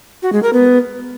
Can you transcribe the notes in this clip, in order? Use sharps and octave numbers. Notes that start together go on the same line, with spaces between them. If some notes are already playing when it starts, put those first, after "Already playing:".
F#4
G#3
A#4
B3